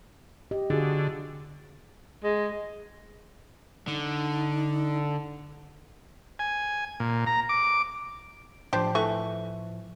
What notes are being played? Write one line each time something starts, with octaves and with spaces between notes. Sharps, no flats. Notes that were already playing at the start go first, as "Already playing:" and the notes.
G4 D#5
D3 F4 F#4 G#4
G#3
D3 D#4
G#5
A#2
A#5
D6
A2 F3 D4 G4 C5
E3 A3 C#6